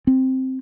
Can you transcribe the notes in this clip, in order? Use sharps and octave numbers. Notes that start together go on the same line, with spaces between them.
C4